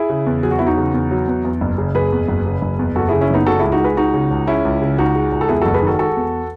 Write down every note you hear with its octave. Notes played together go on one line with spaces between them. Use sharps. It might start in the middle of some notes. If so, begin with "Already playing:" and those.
Already playing: E4 G#4
C#3
E2
F#3 G#4
F#4
E2 E4
D#4 F#4
C#3
E2
F#3
E2
E2
F#1
C#3
F#1 G#4 B4
E2
F#1
C#3
F#1
E2
F#1 F#4 A4
C#3 E4 G#4
C#4 E4
F#1 B3 D#4
C#3 F#4 A4
C#2 E4 G#4
D#4 F#4
G#3 G#4 B4
C#2 D#4 F#4
C#3
C#2
G#3 C#4 E4
C#2
C#3
C#2 D#4 F#4
G#3
C#2
A4
E2 E4 G#4
F#1 F#4 A4
G#4 B4
D#3 F#4 A4
G#3 F#4 A4
E2